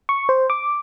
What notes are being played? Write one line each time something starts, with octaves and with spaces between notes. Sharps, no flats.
C#6
C5
D6